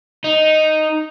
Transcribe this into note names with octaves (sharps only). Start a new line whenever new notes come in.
D#4